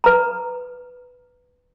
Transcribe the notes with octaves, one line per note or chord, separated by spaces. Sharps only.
B4 A#5